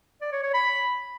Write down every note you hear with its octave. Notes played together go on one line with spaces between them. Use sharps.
D5
C#5
C#5
B5